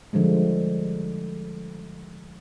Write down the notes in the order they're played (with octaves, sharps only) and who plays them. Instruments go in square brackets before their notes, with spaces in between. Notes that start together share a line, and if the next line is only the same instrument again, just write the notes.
[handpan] D3 F3 G3 G#3